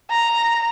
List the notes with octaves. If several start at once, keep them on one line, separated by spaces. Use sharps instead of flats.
A#5